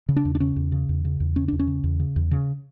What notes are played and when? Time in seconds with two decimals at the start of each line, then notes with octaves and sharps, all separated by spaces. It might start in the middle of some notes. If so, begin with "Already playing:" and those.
0.09 C#3
0.16 D4
0.25 E2
0.35 D4
0.40 C#3 C#4
0.56 E2
0.72 C#3
0.89 E2
1.05 C#3
1.20 E2
1.36 C#3 C#4
1.48 E2 D4
1.59 C#4
1.67 C#3
1.84 E2
2.00 C#3
2.16 E2
2.31 C#3